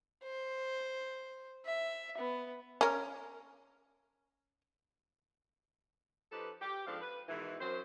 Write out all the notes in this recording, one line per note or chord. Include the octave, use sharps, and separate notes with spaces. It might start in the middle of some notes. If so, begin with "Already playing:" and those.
C5
E5
B3
C#4 A#4
F3 D#4 G4 A4 B4
G4
G#2 F3 C4 D4 A4 F5
B4
G#2 B2 D#3 E3
F#2 C5